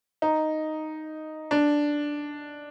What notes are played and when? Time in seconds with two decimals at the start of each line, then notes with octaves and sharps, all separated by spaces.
0.22 D#4
1.51 D4